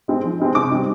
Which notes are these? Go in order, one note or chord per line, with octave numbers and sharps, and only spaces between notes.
G#3 C4 D#4
F3
G#3 C4 D#4
C3 D6
G3 C4 D#4